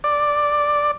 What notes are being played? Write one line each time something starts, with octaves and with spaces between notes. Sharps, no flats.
D5